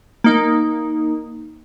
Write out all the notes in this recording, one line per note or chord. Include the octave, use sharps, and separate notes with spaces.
A#3 D#4